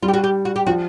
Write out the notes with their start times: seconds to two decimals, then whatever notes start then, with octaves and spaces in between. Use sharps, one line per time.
0.03 G3 F4
0.08 G4
0.14 F#4
0.24 G4
0.45 F#4
0.56 G4
0.67 F3 F#4